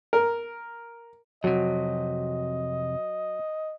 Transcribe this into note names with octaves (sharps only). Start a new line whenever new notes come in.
A#4
F2 C3 F#3 D#5